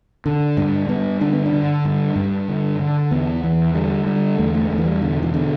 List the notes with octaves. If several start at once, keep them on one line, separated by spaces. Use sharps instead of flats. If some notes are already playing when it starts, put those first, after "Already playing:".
D3
G2 D4
G2 B3
D3 D4
B3
D4
D3
G2
G2
D3
D3
E2 B3
E2 E3
D3 G3
D3 G3
E2 A3
A3
E2 A3
E3
G3
B2 D3
E3
B2 D3